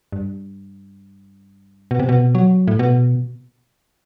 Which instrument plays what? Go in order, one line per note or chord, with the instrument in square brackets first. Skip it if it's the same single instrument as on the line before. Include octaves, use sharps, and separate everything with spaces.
[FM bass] G2
B2
C3
B2
F#3
A2
B2